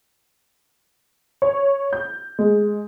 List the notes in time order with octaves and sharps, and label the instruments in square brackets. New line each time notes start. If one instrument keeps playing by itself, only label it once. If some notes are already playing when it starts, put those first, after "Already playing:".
[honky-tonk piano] C#5
G6
G#3